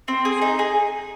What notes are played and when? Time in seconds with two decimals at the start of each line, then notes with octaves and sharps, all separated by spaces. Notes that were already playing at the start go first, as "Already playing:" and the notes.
0.08 C4
0.25 G#4
0.41 D#4
0.59 G#4